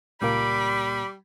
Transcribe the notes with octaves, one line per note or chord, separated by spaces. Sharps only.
C#2 A#2 G3 A#3 B5 D6